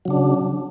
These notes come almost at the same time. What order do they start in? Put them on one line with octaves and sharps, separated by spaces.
F#3 C#3 D4